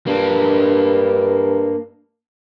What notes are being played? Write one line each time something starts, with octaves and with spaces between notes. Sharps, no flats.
G2 A#3 D4